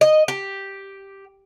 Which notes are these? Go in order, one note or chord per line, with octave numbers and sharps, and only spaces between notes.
D#5
G4